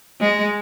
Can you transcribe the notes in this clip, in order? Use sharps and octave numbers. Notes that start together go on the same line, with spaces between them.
G#3